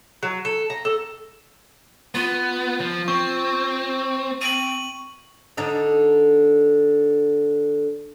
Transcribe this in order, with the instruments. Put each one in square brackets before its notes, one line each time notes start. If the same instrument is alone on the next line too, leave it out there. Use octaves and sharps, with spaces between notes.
[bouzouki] F#3
A4
A#5
A4
[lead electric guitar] B3 [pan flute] F4
[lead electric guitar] F3
[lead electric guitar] C4 [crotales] C#6
[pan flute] C4 [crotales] D#7 F#7
[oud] D3 D4 D#4